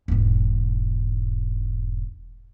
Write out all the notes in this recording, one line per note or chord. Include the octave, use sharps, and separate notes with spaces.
E1 G#2